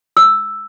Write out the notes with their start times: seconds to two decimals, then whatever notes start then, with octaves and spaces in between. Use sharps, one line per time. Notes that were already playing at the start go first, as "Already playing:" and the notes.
0.17 E6